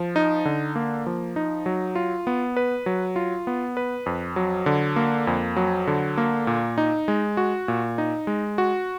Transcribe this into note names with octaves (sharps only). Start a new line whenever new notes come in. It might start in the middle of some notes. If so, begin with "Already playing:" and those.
Already playing: F3
D#4
D3
A#3
F3
D#4
F#3
F4
B3
B4
F#3
F4
B3
B4
F2
F#3
D3
A#3
F2
F#3
D3
A#3
A#2
D#4
G#3
F#4
A#2
D#4
G#3
F#4